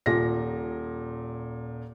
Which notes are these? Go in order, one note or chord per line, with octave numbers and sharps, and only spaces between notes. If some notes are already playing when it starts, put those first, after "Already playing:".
D#1 A#2 A#6